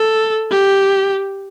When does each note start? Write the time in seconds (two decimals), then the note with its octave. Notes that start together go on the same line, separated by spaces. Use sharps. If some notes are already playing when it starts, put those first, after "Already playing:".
Already playing: A4
0.51 G4